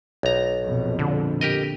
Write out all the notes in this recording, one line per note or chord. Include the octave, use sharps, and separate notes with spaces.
B1 A#5
A#1 F2 B2
D3
G4 A#4 D#5